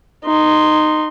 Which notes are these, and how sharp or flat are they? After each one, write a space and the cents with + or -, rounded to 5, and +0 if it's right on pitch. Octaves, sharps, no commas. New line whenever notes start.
D#4 -15 C6 +0